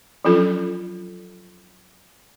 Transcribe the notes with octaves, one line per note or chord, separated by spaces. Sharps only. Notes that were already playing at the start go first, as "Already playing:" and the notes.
F3 F#3 C#4 D4 F4 A4